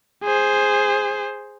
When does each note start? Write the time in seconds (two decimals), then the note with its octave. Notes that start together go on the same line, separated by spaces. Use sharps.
0.24 G#4 C5